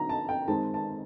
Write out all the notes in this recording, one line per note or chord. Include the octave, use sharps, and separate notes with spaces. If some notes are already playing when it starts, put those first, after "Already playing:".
Already playing: D3 F#3 B3 D#4 A#5
A5
G5
D#3 G#3 C4 D#4 A5
A5